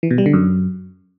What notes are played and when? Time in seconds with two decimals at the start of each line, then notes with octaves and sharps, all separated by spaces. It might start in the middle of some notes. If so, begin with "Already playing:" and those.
0.03 E3
0.11 B2
0.18 G3
0.26 D3
0.33 F#2